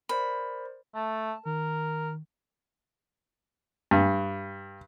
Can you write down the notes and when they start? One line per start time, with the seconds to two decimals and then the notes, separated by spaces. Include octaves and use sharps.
0.09 A#4 C5 D5 B5
0.95 A3 A5
1.46 D#3 A#4
3.91 G2